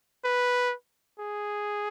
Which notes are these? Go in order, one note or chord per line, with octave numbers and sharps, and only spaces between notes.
B4
G#4